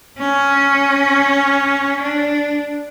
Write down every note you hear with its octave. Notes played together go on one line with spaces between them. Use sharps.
C#4
D4